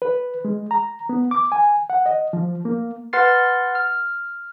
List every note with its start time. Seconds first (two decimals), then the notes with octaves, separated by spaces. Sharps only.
0.02 B4
0.45 G#3
0.71 A#5
1.09 B3
1.31 D6
1.52 G#5
1.90 F#5
2.06 D#5
2.33 F3
2.65 A#3
3.13 B4 F#5 C6 F6 A6 C7
3.75 F6